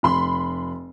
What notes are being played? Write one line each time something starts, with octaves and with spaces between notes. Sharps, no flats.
F1 B5 C6